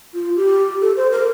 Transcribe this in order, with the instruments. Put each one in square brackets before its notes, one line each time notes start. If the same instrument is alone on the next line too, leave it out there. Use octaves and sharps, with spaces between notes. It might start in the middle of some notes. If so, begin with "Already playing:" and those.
[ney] F4
G4
A4
C5
A#4